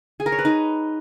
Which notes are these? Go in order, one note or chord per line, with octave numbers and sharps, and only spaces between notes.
G#4
A#4
C#5
B4
D#4